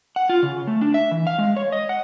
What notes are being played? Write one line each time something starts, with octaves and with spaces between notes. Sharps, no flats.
F#5
F4
C#3
A3
D4
E5
E3
F5
G#3
C#5
D#5
F#5